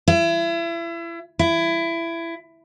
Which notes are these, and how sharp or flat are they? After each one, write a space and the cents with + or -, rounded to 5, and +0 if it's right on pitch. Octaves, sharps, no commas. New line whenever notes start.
E4 +35
E4 +20